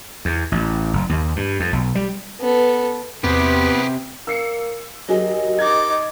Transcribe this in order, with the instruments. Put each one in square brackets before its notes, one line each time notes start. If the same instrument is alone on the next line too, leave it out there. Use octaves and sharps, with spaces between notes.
[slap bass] E2
A1
F#1
D#2
G2
F2
B1
G3
[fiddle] B3 A4
[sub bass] E2 [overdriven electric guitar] C3 [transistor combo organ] B3 [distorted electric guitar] G4 G#4
[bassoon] A#3 [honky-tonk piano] E6 C7 C#7
[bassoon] D#2 [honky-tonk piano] F#3 G#4 [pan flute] D#5
[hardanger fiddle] D#4 D6 [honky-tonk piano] G#6 A6